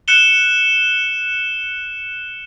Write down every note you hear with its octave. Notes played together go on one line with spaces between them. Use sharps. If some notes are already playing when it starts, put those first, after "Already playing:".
F#6 C#7 E7 G7